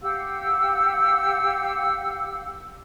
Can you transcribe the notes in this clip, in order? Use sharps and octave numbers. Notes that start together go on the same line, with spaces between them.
G4 F5 F#5 E6